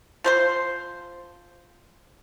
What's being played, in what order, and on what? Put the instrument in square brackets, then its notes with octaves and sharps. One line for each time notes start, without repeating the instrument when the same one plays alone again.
[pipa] F3 C5 C6